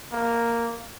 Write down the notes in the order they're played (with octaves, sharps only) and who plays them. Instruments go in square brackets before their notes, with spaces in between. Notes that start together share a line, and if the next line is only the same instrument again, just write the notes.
[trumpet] A#3